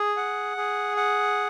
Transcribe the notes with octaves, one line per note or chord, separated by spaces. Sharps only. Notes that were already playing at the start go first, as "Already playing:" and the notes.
Already playing: G#4
F#5
G#4
F#5